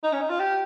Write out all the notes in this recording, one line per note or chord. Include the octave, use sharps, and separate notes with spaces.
D#4
C#4
D#4
F4
G4